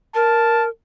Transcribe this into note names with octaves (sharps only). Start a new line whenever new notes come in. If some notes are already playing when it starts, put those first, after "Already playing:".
A#4 A5